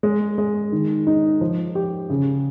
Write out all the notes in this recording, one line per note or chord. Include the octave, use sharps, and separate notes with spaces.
G#3
G#3
D#3
D#4
F3
G4
C#3